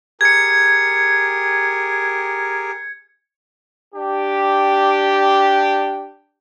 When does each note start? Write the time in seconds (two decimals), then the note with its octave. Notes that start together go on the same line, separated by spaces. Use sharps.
0.21 G4 G#4 A#4 G#6 C#7
3.94 D4 G4